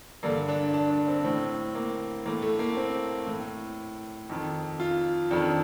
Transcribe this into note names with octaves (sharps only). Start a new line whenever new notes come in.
G2 D3 A#3
D4
D4
D4
C4
A2 C4
A#3
A2 A#3
A3
A#3
C4
A2
F2 D#3
F4
F2 D#3 D4